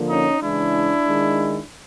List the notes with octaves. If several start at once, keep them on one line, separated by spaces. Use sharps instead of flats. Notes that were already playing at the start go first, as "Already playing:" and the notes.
Already playing: D3 F3 A#3
C#4 D#4
C#3 E3 G#3 D4 E4
D#3 G#3